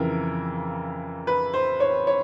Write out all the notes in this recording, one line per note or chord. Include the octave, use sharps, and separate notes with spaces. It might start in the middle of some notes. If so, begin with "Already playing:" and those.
Already playing: F2 C#3 E3 A#4
B4
C5
C#5
C#5